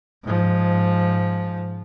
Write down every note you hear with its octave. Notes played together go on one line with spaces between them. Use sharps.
G#2 F3